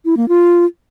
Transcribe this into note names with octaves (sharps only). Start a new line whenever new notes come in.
E4
A#3
F4